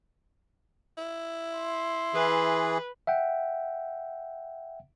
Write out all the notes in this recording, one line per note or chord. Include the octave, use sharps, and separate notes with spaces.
E4
C6
E3 G#4 B4
E5 F#5 G5